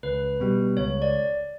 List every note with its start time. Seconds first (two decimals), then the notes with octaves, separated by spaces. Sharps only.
0.03 C#2 B4
0.40 B2 G3
0.77 C#2 C#5
1.02 D5